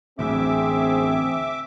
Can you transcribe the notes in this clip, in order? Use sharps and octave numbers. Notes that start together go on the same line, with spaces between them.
A1 D2 C4 G#4 E5 D6